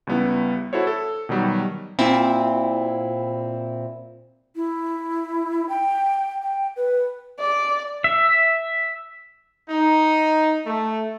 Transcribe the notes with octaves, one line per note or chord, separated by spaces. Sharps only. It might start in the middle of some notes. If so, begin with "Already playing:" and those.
C#2 G3 B3 E4
E4 F#4 A4 C5 C#5
A4
B2 D#3 F#3 G3
A#2 C4 E4
E4
G5
G5
B4
D5
E5
D#4
A3